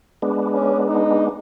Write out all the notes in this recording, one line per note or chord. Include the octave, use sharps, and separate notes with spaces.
G#3 B3 D4
C#4
D#4